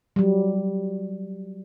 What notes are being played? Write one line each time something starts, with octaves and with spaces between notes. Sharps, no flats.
F#3 G3